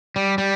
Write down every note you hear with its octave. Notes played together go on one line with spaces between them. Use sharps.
G3
G3